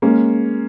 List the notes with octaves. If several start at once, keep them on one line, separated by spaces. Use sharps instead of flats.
G#3 A#3 C#4